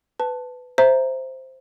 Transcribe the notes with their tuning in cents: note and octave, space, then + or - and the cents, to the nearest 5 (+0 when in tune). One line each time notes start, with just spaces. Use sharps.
B4 +15 A5 +0
C5 +0 E5 +0 A#5 +0